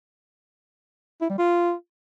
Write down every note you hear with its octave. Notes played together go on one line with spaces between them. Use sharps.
E4
G3
F4